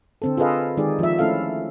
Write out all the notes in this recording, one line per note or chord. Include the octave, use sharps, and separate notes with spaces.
D3 C4 A4
F4 G#4 A4 B4 D#5 F5
D#3 G#3 D#4 G4 G#4 D5
F3 E5
A3 C#4 E4 A4 F5